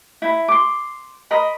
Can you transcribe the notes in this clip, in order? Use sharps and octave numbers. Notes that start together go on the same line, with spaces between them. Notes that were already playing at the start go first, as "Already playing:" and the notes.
E4 B5
C6 D6
A#4 D#5 B5 C6